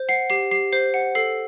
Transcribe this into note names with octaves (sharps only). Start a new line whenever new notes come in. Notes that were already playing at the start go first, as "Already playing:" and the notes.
Already playing: C5
F#5 C7
G4 C7
G4 C7
C5 C7
F#5
A4 C7